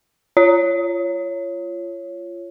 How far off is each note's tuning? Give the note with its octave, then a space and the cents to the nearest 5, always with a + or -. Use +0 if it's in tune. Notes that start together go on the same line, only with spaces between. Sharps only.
F4 -25 C#5 +0